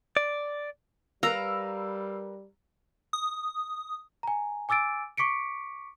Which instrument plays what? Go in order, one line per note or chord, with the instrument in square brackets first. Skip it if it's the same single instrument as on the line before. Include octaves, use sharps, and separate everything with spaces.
[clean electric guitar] D5
[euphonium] G3 [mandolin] A#4 B4 [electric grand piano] F5 E6 [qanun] A#5
[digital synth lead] D#6
[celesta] G#5 A#5
G#5 D6 E6 A6 D7
C#6 D6 B6 C#7 D7